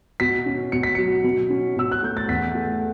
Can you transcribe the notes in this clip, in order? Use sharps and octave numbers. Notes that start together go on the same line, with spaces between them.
B2 B6
C#4
B2 C#7
B6
F#3 C#7
B2
C#4
B2 E6
F#6
A3 G6
A6
E2 B6
A3